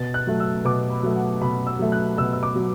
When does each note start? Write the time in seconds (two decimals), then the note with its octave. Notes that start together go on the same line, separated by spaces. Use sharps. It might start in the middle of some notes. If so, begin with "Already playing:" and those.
Already playing: B2 A6
0.14 F#6
0.27 F#3 A3
0.40 E6
0.65 B2 D6
0.90 B5
1.03 F#3 A3
1.16 F#5
1.41 B2 B5
1.67 E6
1.79 F#3 A3
1.92 F#6
2.18 B2 E6
2.33 E6
2.43 D6
2.55 F#3